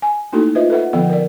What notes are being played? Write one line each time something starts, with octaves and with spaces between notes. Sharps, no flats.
G#5
A3 A#3 D#4 E4 F#4 A4
F4 B4 C5 D#5 E5
A4 B4 E5 F#5
D3 F3 B3 A4 F#5 G5
A#4 D5